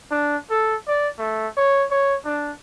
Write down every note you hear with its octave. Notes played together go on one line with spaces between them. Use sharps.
D4
A4
D5
A3
C#5
C#5
D4